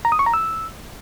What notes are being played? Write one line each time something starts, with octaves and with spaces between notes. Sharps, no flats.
A#5
D#6
C#6
A#5
E6